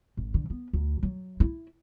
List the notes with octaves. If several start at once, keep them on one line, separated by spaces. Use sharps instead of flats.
G#1
D3
B3
D2
F#3
E4